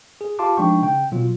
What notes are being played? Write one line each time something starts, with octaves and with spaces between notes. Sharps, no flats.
G#4
F4 G4 F5 A5 C6 D6
F3 G#3 D4 D#4 G5 C#6
C#3 G5
B2 F#3 F4